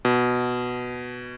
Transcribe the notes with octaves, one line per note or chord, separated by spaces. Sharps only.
B2